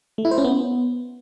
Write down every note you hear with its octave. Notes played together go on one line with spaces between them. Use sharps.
A3
E4
C5
C#4
B3